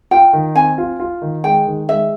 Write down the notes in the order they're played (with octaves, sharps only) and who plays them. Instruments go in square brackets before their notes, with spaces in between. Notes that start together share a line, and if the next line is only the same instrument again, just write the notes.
[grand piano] F4 [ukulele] G5
[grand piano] D#3
[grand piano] C4 [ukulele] G#5
[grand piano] F4
F4
D#3
[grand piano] G#3 [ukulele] G5
[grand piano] D#3
[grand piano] G#3 [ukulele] E5